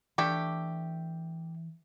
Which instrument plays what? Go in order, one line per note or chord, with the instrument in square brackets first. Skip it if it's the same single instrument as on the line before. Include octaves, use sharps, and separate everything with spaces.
[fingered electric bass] E3 [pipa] A3 D4 G4